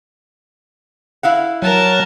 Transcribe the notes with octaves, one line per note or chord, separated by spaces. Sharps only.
E4 F5 F#5
F#3 A#4 A5